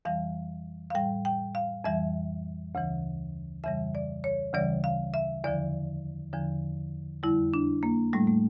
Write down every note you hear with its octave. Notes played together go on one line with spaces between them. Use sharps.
F2 E3 G3 F5
F5
A2 G3 G5
G5
F5
F2 E3 G3 E5
D2 C#3 E3
F2 C#3 E3 G3 E5
D5
C#5
D2 C#3 E3 G3 D5
F5
E5
E2 D3 F3 D5
E2 D3 F3
F2 D3 G3 E4
D4
A#3
A2 G3 A3
A3